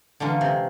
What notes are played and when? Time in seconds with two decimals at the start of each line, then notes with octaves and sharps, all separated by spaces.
0.20 D3 E3 G#3 C#4 F4 A#4
0.41 C3